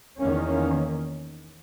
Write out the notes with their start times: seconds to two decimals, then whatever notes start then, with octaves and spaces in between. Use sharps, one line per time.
0.19 E2 D#3 A#3 C#4